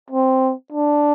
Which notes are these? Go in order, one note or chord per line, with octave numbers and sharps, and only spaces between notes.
C4
D4